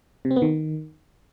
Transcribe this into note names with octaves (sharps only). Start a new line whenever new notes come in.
C3
C4
B3
D#3